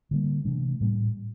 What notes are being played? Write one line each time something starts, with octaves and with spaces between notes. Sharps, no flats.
D3 G3 A#3
C3 E3 A3 D4
A2 G3 A#3